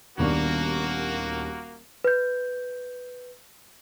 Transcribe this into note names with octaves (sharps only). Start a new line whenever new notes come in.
D#1 D#2 B2 A#3 B3 D4 F#4 C#6
B4 G6